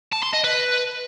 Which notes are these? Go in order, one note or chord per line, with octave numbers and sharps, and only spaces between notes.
A5
C6
D#5
B4